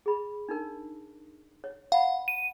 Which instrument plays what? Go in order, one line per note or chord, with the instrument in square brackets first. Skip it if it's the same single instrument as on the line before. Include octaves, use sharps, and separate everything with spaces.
[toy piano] G#4 B5
D4 D#4 A#4
C#5
[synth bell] F5 [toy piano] F#5 B5
[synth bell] D#7